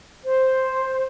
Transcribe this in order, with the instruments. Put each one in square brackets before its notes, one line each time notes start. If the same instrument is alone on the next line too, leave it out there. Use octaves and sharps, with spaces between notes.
[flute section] C5